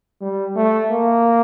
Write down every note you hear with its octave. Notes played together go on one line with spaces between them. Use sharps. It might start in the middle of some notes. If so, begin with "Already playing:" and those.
G3
A3
A#3